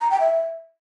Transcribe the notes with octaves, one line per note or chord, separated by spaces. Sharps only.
A#5
G5
E5